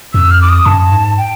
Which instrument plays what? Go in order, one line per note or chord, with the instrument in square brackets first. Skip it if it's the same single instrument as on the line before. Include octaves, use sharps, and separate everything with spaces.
[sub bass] F2 [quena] E6
[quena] F6
D6
D#6
[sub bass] F#2 [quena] A5
[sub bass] G#2
[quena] G5